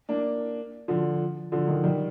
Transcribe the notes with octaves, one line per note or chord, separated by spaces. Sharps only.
A#3 D4
D3 F3
D3 F3
D#3
D#3 G3